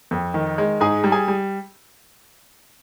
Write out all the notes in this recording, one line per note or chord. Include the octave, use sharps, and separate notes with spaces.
F2
D#3
G#3
G#2 G#4 G#5
G3
G#4 G#5
G3